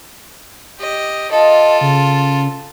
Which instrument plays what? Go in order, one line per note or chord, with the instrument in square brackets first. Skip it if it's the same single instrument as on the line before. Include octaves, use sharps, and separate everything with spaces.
[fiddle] G4 D#5
[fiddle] F4 A4 [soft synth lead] D#5
[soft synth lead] C#3